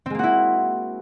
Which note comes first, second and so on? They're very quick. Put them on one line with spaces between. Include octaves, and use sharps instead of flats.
C4 G#3 A#3 F#4 E4